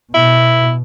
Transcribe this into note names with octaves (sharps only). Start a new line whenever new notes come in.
B2 E4